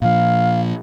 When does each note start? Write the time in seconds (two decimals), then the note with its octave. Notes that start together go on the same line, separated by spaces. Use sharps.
0.02 A#2 F3 F5